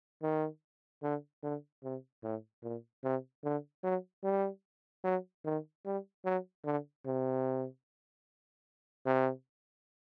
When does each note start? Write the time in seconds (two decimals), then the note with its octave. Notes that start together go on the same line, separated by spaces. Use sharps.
0.22 D#3
1.02 D3
1.43 D3
1.83 C3
2.23 A2
2.63 A#2
3.04 C3
3.44 D3
3.83 F#3
4.23 G3
5.04 F#3
5.45 D#3
5.85 G3
6.25 F#3
6.64 D3
7.06 C3
9.06 C3